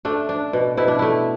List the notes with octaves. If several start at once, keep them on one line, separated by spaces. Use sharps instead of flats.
A3 D4
D4
B2
B2 E4
D4
A3 E4